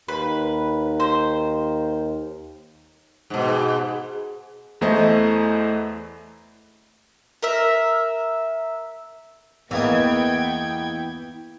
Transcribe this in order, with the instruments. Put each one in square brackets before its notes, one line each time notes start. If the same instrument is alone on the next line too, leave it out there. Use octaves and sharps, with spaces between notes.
[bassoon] D#2 [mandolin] B4
[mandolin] C5
[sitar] G#2 B2
[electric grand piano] E2 E3 A3 E4 C5 D#5
[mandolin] A#4 E5
[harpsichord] E2 A#3 D#5 [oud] E3 [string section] B3 G5 G#6